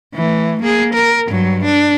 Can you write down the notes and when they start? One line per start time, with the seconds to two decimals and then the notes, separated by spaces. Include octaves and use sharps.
0.14 E3 A3
0.62 A#3 G#4
0.94 A#4
1.28 G2 F#3
1.65 D4